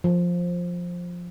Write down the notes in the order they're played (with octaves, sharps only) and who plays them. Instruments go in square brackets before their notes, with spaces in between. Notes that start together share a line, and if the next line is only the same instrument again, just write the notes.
[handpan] F3